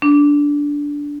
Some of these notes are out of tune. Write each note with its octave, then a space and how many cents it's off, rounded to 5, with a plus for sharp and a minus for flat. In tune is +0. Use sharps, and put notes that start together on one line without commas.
D4 -15